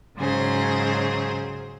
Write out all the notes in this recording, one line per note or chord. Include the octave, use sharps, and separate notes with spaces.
G#2 C#3 F#3 G#4 C5